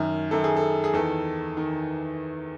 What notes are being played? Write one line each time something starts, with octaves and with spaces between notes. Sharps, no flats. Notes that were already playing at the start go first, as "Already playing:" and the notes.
Already playing: F#2 D#3
F#2 D#3 A4
G#4
A4
G#4
E2 D#3 A4
D#3